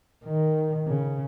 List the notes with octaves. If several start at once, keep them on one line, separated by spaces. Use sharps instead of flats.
D#3
C#3